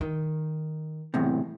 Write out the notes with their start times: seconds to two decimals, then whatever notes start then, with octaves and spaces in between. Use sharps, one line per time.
0.01 D#3
1.14 E2 A2 C3